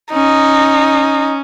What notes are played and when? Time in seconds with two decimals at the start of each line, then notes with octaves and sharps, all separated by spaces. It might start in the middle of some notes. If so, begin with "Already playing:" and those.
0.13 C#4 D#4